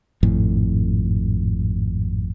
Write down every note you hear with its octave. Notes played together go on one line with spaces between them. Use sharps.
G#1 F2 A2